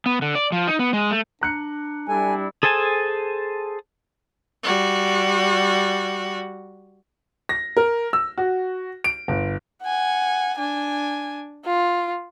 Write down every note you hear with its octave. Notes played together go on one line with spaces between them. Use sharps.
B3
D3
D5
F3
D#4
B3
G#3
A3
D4 A#5 F#6 C#7
G3 D4 E4 A4 G#5
G#4 A4 C5 G#5 A5
G3 F#4
A#6
A#4
E6
F#4
D7
G1
F#5 G#5
D4 G#5
F4